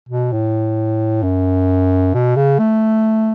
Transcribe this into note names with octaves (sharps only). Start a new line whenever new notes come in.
B2
A2
F#2
B2
C#3
A3